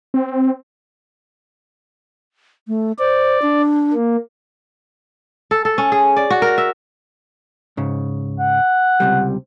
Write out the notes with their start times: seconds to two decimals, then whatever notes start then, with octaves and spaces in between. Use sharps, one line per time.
0.14 C4
2.68 A3
2.99 C5 D5
3.42 D4
3.93 A#3
5.51 A4
5.65 A4
5.78 C#4
5.92 G#4
6.16 D5
6.30 F#4
6.42 A#4
6.58 E5
7.77 G#2 C#3
8.40 F#5
9.00 C#2 C3 G3